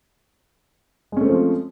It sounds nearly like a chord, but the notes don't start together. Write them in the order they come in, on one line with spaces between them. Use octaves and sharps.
G#3 C#4 A3 C4 F3